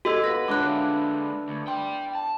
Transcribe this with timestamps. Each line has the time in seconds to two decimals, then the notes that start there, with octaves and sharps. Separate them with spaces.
0.05 F#4 A4 D#5 E6
0.24 B3 F4 B4 A#6
0.48 D3 G#3 D4 E4 B4 D6 F#6
1.49 D2
1.68 D5 G5 C6
2.15 A5